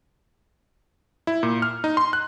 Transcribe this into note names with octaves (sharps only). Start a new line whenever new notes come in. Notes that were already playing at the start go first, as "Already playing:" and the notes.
E4
A#2
F6
D#4
C6
F#6